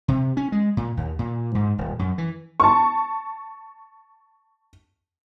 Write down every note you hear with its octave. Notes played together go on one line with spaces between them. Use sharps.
C3
C#4
G#3
A#2
D#2
A#2
G#2
D#1
F#2
E3
A5 C#6